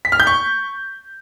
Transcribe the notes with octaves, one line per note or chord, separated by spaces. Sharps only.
B6
F6
G6
C#6